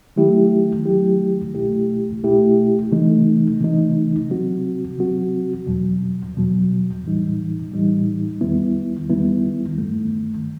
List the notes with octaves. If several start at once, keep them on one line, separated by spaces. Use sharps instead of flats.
D#3 F#3 A3 E4 G4
D#3 F#3 A3 E4 G4
C2 B2 A3 E4 G4
C2 B2 A3 E4 G4
C3 E3 A3 D#4
C3 E3 A3 D#4
C3 F#3 C4 F#4
C3 F#3 C4 F#4
E2 B2 F#3
E2 B2 F#3
A2 E3 G3 D#4
A2 E3 G3 D#4
E2 D#3 G3 B3 E4
E2 D#3 G3 B3 E4
G2 D#3 A3